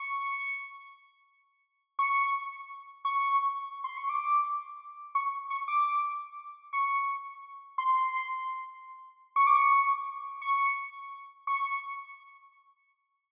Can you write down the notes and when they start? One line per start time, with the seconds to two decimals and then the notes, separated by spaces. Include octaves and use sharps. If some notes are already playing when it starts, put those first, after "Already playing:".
Already playing: C#6
1.99 C#6
3.05 C#6
3.84 C6
3.97 C#6
4.09 D6
5.15 C#6
5.50 C#6
5.68 D6
6.73 C#6
7.78 C6
9.36 C#6
9.47 D6
9.56 C#6
10.42 C#6
11.47 C#6